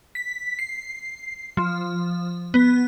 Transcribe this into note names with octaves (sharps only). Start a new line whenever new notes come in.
B6
C7
F3
B3